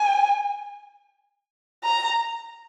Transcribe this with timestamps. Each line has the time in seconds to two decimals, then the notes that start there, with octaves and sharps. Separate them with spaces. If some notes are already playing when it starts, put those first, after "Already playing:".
Already playing: G#5
1.84 A#5